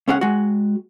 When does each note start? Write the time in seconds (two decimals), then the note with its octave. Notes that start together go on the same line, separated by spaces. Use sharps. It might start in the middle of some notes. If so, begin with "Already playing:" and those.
0.08 C#2 C#4 G#4 F#5
0.21 G#3 F#4